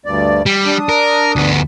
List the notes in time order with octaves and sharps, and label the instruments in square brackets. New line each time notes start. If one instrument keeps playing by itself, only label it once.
[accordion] D2 G2 D5
[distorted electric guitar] G3
[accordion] D4 D#6
[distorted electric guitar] A#4
D2 B3